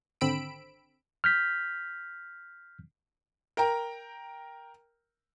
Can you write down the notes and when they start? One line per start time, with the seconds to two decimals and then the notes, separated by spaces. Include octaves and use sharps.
0.21 G#1 D3 C4 B5 E6 D7
1.24 F6 G6 B6
3.57 A#4 G5 A#5